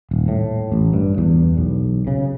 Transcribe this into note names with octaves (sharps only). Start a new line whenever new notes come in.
D#1
A2
A1
G2
E2
B1
C#3